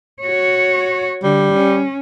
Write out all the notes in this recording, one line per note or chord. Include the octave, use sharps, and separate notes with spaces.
F#4 C#5
D3 G3
C#4